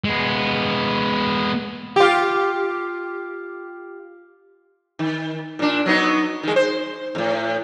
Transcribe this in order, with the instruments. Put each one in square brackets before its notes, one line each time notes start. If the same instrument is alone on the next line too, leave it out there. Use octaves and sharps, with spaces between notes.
[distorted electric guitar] G#3 B3
[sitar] F4 G4
D#3
A#2 D4
F#3 B3 D#4
D#3 G#3
C5
D#2 A2